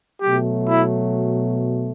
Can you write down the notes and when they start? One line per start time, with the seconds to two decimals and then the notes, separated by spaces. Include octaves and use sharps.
0.21 B2 F#3 A3 G4
0.67 E4